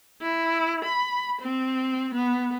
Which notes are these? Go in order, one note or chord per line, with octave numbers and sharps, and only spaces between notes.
E4
B5
C4
B3